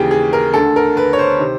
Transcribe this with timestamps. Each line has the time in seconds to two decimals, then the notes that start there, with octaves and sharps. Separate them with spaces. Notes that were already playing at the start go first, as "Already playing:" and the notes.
Already playing: D#2 C#3 E3 G4 G#4
0.11 G#4
0.33 A#4
0.54 D2 D3 A4
0.76 A#4
0.97 B4
1.13 C#5
1.19 C5
1.39 C3 D#3